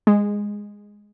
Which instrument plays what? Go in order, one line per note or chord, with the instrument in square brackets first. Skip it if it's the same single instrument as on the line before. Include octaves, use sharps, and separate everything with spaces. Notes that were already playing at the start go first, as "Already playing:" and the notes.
[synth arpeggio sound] G#3